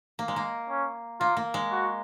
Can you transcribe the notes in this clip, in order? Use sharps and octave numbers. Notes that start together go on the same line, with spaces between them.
A#3
G#3
A#3
C#4
A#3 F4
A#3
G#3
F#4